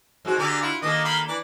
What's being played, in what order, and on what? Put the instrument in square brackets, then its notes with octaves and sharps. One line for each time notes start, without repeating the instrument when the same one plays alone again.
[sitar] G#2 G#3 F#4
[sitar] D3 [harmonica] G4 G#4 A#4
[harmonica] E4 F4
[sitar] D#3 A#3 A4 [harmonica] D#5 D6 D#6
[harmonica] F5 G5 B5
E3 D4 D6